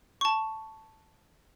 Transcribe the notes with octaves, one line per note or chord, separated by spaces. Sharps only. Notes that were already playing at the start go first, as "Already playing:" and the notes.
A5 C#6